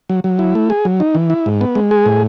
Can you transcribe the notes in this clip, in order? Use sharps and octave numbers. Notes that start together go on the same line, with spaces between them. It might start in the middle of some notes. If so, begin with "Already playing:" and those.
F#3
F#3
E4
A3
G#4
F#3
D#4
E3
E4
G#2
B3
G#3
G#4
A2